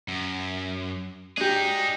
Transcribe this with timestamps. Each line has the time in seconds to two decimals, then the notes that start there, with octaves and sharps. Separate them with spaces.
0.08 F#2
1.37 D4 D#4 G4 G#4